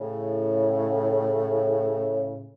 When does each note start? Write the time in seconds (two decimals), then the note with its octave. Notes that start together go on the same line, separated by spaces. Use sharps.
0.01 A2 C#3